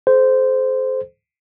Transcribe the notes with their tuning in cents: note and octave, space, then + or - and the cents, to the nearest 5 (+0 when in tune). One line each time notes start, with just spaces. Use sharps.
A4 -45 C5 -10